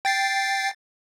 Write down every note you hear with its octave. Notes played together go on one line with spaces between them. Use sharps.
G5 A6 C7